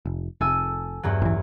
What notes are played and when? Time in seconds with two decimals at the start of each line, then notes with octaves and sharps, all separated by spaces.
0.05 F1
0.41 F1 A4 G#5 E6
1.03 E2 G2 F#3
1.22 A1 E3